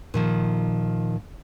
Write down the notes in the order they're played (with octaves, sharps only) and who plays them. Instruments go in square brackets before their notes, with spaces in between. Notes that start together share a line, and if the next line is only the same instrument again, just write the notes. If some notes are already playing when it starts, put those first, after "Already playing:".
[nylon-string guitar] A#2 D#3 F3